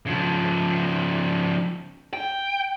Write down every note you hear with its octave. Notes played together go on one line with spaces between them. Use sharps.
C#3 F3
G5